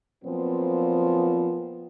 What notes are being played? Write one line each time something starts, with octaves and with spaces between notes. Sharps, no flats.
A#2 F3 F#3 B3 C4